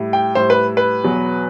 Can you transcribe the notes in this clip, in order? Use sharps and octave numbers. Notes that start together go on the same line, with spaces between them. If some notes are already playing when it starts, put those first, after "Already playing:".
Already playing: A2 G3
G5
A2 G3 C5
B4
B4
E2 B2 F#3